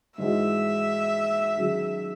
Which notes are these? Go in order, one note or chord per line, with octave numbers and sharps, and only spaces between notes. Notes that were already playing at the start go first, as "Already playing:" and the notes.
G#2 E3 G#3 D#4 F#4 E5
D#3 F#3 C#4 G#4